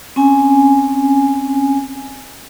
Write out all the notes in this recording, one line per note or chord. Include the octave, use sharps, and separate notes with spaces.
C4 C#4 G#5